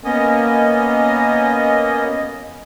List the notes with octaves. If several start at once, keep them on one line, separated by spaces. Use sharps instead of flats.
A#3 B3 C#4 D#5